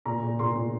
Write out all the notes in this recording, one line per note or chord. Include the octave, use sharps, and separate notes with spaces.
A#2 A#5
A#2
A#2 C6
A#2